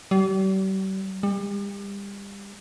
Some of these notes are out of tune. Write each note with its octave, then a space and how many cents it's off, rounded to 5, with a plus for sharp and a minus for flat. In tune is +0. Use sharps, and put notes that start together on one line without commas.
G3 -40
G3 +35